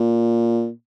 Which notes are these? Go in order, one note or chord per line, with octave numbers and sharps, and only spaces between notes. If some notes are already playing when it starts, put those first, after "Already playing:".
Already playing: A#2